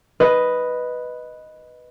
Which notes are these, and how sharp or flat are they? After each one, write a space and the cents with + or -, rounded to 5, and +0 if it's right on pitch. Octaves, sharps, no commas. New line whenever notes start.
B4 +0 D#5 +0